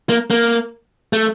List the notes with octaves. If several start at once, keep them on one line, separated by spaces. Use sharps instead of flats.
A#3
A#3
A3